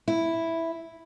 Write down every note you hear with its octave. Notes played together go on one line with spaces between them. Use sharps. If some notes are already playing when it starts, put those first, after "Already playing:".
E4